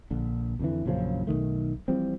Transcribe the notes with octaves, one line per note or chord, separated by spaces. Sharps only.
A#1 D3
F2 D3 E3
A#1 F#2 C#3 F3
B1 F2 D#3 A3
E3 F3 G3 C4